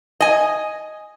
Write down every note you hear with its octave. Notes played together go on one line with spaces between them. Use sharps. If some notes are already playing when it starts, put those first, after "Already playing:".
D#5 G#5